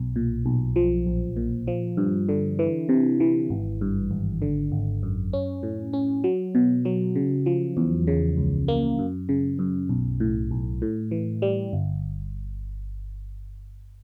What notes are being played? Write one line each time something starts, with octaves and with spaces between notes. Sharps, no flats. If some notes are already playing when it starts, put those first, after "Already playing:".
Already playing: B1
A#2
B1
F3
A#1
A#2
F3
G2
D3
E3
C3
E3
G#1
G2
G#1
D3
G#1
F#2
C#4
A2
C#4
F#3
B2
F#3
C#3
F3
E2
C#3
C#2
A#3
F#2
C#3
F#2
B1
A2
B1
A2
E3
G3
G1